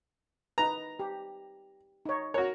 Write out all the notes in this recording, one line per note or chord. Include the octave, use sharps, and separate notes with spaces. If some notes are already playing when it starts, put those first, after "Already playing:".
D#4 B4 A#5
G4
D#4 C#5
F#4 A#4 C#5